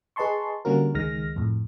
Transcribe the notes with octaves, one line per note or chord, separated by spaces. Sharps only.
G#4 B4 D#5 A5 C6 C#6
D3 G3 A#3 C#4 F#4 A#4
C#2 D#3 G#3 F6 A#6
F2 A2